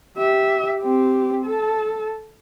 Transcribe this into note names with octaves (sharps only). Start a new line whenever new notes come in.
G4 E5
C4 G4
A4 A5